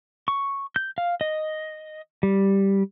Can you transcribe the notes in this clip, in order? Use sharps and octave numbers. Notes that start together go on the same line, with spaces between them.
C#6
G6
F5
D#5
G3